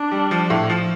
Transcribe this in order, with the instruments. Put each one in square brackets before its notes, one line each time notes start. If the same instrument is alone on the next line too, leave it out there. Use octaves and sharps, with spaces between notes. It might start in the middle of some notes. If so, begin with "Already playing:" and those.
Already playing: [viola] D4
[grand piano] G3
F3
A2
F3